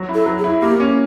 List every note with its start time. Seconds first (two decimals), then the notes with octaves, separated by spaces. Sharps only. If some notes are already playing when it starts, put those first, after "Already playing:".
Already playing: F#3
0.09 E4
0.14 A4
0.26 F#3
0.38 G#4
0.44 E4
0.62 A#3 G4
0.80 C#4